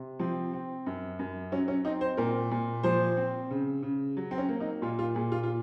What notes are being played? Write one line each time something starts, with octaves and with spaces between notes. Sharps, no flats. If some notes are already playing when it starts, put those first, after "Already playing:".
Already playing: C3
F3 C4
C4
F#2
F#2
F#3 C#4
C#4
C4 D#4
C5
A#2 A#4
A#2
F3 C5
C4
C#3
C#3
F#3
C4
C#4
A#3
D#4
A#2 F4
F4
A#2 G#4
F4
F4